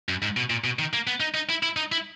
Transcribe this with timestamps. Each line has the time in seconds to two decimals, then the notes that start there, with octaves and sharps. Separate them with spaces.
0.09 F#2
0.22 G#2
0.37 B2
0.50 A#2
0.64 B2
0.79 D#3
0.93 A#3
1.07 B3
1.20 D#4
1.34 D#4
1.49 E4
1.63 E4
1.77 D#4
1.92 E4